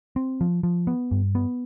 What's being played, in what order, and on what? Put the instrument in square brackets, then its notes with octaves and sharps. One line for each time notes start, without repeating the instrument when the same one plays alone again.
[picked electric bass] C4
F3
F3
B3
G2
B3